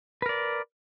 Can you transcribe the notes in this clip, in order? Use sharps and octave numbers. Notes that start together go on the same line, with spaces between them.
A#4 B4 D5